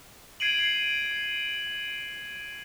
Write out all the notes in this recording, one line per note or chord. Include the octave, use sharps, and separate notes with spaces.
G#6 C7 D7 D#7 F#7